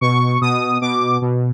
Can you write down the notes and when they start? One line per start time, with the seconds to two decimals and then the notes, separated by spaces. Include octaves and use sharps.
0.01 B2 C#6
0.41 B2 D#6
0.81 B2 D6
1.22 B2